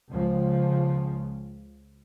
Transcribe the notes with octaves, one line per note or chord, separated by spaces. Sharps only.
C#2 C#3 F3